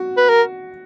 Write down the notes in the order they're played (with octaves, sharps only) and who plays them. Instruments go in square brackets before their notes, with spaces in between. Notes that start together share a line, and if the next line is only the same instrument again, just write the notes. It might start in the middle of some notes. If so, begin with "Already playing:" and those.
Already playing: [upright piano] F#4
[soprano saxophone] B4
A#4